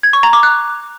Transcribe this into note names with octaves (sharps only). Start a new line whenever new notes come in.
G#6
C#6
A#5
D6
F#6